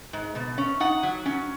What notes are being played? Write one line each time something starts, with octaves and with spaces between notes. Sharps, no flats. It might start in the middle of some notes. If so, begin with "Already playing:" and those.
G#2
B2
C#4
D#4 F#5
F#3
C#4